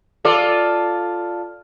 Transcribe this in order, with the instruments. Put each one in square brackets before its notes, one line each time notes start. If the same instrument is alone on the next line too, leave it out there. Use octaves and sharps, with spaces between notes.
[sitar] F4 A4 D5